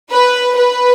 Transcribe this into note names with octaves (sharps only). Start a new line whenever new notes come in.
B4
B4